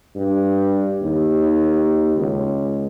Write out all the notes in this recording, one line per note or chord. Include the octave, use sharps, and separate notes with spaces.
G2
D#2
C#2